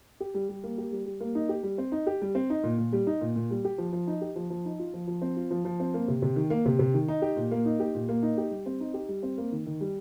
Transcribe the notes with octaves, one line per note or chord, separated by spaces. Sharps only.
G4
G3
G3
A#3
G4
G3
G3
A#3
D#4
G4
G3
C4
D#4
G4
G3
C4
D#4
A#2
A#2
G3
D#4
A#2
A#2
G3
G4
F3
F3
D#4
G4
F3
F3
D#4
F4
F3
F3
C4
F4
F3
F3
C4
A#3
C3
C3
D#3
A#3
C3
C3
D#3
D#4
G4
A#2
A#3
D#4
G4
A#2
A#3
D#4
G4
G3
C4
D#4
G4
G3
C4
A#3
D#3
D#3
G3